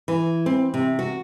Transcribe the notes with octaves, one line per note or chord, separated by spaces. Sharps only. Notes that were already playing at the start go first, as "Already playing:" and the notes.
E3
C4
C3
F#4